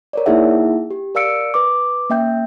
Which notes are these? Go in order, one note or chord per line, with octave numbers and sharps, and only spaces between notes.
A#4 C#5 D5
A#3 D#4 E4 G#4 E5 F#5
G4
A#4 D5 F5 E6 C#7 D7
B4 D6
A#3 C#4 E5 G5 G6